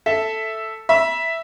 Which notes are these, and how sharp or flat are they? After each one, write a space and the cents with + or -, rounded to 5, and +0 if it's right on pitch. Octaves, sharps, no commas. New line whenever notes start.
A4 +0 E5 +0
E5 +0 B5 -40